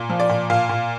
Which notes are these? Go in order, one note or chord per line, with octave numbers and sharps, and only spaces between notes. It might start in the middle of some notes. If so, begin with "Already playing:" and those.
Already playing: A#2
F3
D5
A#2
A#2 F5
A#2